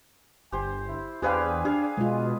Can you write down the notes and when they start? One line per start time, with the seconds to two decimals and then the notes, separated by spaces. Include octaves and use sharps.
0.52 G1 G4 C5 G#5
0.88 E4
1.22 E2 D4 G4 G#4 B4 C5 F5 G#5
1.65 D4 G4 G#4 F5
1.97 B2 G#3 F4